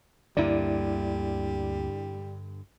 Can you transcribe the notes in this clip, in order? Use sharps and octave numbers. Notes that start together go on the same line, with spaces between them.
D2 G2 D3 G3 A#3 E4 D5